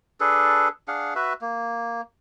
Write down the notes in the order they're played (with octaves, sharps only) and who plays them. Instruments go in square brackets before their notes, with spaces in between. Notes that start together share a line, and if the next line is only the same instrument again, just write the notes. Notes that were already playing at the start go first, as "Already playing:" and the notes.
[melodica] D4 G#4 A4 B4
D4 G#4 F5 F#5
F#4 B4 E5
A#3